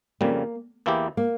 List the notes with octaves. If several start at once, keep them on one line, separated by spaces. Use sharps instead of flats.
F2 C#3 G3 A#3
E2 E3 A#3 E4 G4
A#3